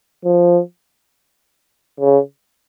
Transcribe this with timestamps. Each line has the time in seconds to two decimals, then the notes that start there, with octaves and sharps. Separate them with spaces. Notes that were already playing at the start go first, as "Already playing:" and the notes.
0.25 F3
2.00 C#3